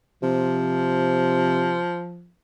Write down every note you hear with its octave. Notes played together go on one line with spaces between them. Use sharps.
C3 F3